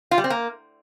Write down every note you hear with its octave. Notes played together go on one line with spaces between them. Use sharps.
F4
G3
C4
A#3